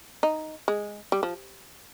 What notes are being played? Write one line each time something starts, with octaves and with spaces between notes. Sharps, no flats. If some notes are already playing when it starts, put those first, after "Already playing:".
D#4
G#3
G3
F3